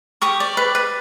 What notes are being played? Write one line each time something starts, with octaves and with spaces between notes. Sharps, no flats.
G4 C#6 D#6
D5
B4
B4